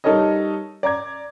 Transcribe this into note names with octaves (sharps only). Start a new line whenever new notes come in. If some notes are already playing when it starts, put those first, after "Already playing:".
G3 D#4 A4 A#4 C#5 D#5
D5 A#5 D6 G#6